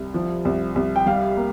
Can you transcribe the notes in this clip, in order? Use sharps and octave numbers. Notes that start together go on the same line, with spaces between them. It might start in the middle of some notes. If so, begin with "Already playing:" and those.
Already playing: C2
F3
C2
C2
G5
G3 F5
A#3